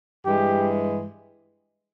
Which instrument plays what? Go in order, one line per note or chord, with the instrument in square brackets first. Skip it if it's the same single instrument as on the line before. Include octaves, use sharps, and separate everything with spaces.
[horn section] G2 E3 G#3 G4